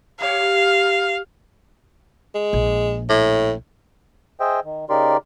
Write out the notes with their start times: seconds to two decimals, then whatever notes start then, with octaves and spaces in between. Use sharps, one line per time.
0.20 G4 C#5 F5
2.35 G#3
2.53 A#1
3.09 A2
4.40 G#4 C5 D#5 E5 G5
4.64 D#3
4.90 C#3 D#4 G4 A#4 D5 C6